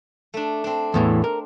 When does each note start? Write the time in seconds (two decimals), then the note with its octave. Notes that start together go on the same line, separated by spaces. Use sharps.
0.34 A3 D4
0.64 C4 D4
0.94 E2 A2 E3
1.24 A#4